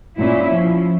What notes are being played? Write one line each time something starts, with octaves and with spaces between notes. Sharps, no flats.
A#2 C#4 E4
F3